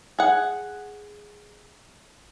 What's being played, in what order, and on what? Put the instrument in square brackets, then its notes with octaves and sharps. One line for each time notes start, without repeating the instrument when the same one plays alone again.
[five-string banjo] G#4 F#5